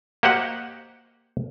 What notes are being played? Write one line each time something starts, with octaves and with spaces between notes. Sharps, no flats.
A#3 F#4 G4 C5 D#5 F#5